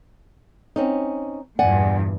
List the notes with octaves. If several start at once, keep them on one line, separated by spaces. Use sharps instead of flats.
C4 C#4 D#4
E2 G2 A#2 D5 F#5 G#5